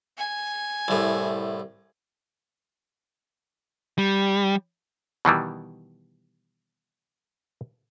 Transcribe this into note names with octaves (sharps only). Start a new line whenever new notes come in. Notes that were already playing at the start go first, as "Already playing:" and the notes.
G#5
C2 A2
G3
B2 D#3 E3 G3